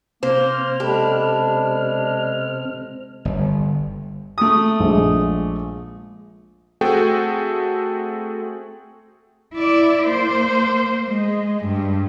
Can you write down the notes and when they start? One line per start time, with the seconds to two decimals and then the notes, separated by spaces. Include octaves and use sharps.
0.23 C3 A#3 C4 C5 F6
0.80 G#3 D4 G4 A4 B5
3.25 G1
4.38 A3 D#6
4.80 A#1 G#3
6.81 A3 C4 F#4 G#4 A4 G5
9.54 E4 D5
10.07 A#3 C5
11.09 G#3
11.65 G2